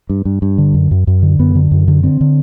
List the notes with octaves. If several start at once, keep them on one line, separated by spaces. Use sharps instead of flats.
G2
G2
G2
D3
F#2
F#2
F#2
D3
F#2 B3
D3
F#2
D3
D3 C4
D3